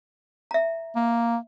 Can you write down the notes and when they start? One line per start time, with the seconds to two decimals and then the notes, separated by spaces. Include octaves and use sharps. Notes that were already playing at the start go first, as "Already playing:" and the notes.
0.51 E5 A#5
0.96 A#3